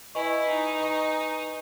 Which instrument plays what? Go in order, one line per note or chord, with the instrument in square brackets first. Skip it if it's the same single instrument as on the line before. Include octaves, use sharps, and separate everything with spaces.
[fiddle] E4 [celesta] B4 D#5 G#5 C#6
[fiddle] D#4
[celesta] B4 D#5 G#5 C#6